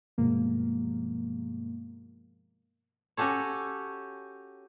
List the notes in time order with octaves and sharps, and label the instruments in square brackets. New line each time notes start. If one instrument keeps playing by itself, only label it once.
[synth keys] G2 B2 F3 G#3 A#3
[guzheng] C#4 F#4 G4 A4 C#5